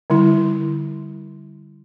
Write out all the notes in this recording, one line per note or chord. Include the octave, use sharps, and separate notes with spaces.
D3 G3 E4